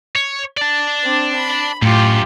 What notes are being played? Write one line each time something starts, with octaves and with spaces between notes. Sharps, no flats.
C#5
D5 A5
C4 D4
B5
F#2 A2 F4 G4